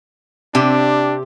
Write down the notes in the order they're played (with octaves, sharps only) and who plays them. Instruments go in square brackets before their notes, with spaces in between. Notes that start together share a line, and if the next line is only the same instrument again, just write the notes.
[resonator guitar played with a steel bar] C3 C4 G4 [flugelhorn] D4